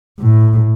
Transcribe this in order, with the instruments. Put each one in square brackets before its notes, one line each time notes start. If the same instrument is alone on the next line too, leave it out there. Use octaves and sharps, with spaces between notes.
[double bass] A2